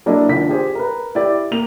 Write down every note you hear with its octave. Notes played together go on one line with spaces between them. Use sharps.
F#3 A#3 D4 E4 D5 D#5
G#1 C#2 D4 B6
G4 G#4 C5
A#4 B4
E4 G4 D5
A#3 F7